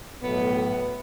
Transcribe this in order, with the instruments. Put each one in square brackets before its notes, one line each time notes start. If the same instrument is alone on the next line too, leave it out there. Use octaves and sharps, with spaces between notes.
[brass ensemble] B1 A2 [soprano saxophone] B3